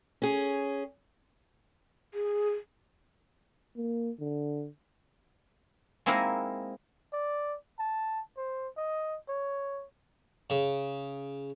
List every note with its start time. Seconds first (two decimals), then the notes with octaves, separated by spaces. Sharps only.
0.22 C#4 G#4
2.14 G#4
3.77 A#3
4.20 D3
6.06 G#3 A#3 C4 D#4 E4 A#4
7.13 D5
7.80 A5
8.37 C5
8.77 D#5
9.29 C#5
10.50 C#3